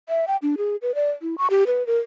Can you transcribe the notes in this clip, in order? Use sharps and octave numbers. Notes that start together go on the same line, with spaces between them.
E5
G5
D4
G#4
B4
D5
E4
C#6
G4
B4
A#4